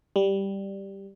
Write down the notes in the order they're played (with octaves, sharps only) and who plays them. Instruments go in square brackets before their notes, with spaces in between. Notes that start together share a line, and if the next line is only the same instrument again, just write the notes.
[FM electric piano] G3